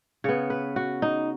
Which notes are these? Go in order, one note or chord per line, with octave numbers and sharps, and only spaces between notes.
C#3 B3 C#5
B4
F#4
D#4